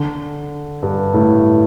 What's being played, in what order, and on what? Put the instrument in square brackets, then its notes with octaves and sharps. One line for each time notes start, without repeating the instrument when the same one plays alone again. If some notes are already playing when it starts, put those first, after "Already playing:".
Already playing: [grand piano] D3
G2
A2